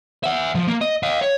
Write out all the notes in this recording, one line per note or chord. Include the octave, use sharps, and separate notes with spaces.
E5 F#5
F3
A#3
D#5
D#5 F5
C#5